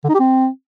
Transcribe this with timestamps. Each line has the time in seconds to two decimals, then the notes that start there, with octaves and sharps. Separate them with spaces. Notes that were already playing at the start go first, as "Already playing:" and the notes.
0.04 D3
0.09 D#4
0.15 G4
0.20 C4